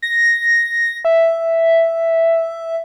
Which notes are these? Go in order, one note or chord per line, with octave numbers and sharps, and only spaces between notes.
A#6
E5